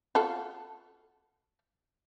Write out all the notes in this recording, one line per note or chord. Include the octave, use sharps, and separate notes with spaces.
F4 F#4 A4